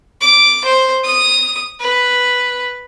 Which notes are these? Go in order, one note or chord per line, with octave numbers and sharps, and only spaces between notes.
D6
C5
D#6
B4